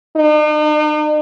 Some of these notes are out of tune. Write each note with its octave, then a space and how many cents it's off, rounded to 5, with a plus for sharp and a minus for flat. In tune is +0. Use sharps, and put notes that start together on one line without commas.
D#4 -45